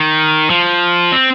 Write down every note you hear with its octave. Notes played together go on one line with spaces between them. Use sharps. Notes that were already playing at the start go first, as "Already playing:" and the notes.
Already playing: D#3
F3
C4